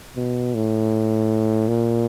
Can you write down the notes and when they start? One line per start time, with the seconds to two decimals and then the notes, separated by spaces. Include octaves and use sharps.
0.16 B2
0.54 A2
1.68 A#2